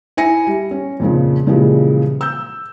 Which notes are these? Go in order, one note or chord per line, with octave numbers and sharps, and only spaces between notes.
E4 G#5 A#6 C#7
G3
C#4
F2 A#2 C#3 F3
A#2 C#3 E3 F3 G3 G#3
E6 G6